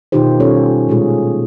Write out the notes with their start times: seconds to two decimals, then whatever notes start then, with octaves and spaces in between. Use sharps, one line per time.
0.12 B2 D#3 D#4 F4 G4 C5
0.40 G3 C#4 F4 G4 A4 C#5
0.89 A#2 G#3 F4 G#4